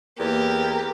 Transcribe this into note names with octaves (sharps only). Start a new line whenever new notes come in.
E2 A#3 G4 A#4